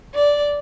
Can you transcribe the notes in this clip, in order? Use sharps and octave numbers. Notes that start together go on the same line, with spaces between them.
D5